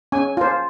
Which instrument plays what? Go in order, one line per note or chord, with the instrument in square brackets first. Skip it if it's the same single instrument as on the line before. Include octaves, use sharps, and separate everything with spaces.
[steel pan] C#4 G#5
F4 C5